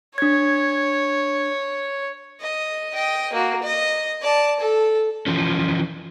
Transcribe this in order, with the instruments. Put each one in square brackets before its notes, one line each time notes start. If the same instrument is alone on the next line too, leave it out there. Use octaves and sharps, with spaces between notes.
[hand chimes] D4 G#6 [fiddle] C#5
[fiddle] D#5
D#5 G5
A#3 F#4
D#5
D5 A5
A4
[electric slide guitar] E3 F3 C#4